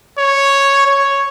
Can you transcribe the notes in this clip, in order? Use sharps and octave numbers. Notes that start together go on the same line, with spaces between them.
C#5
C#5